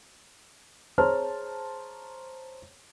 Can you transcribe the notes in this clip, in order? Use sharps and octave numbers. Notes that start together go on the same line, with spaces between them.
G#4 C5 C#5 A5 A#5 F6